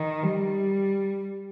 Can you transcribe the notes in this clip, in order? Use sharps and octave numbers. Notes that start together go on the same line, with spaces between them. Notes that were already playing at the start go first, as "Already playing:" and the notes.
Already playing: D#3
G3